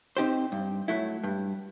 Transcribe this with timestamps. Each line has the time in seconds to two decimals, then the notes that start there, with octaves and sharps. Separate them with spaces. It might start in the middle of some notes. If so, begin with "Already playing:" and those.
0.17 C4 D#4 G4 C5
0.52 G2
0.88 F#3 A3 E4
1.24 G2